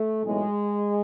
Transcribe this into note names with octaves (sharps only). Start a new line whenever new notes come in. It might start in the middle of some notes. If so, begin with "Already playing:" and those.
Already playing: A3
B1 A2 E3 G#3